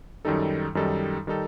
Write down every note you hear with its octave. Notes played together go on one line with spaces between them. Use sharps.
F#2 D#3 G3 D#4 A4
F#2 D#3 G3 D#4 A4
D#3 G3 D#4 A4